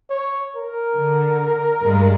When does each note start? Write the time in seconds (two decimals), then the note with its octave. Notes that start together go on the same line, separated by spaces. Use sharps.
0.10 C#5
0.56 A#4
0.95 D3
1.83 G2 G#3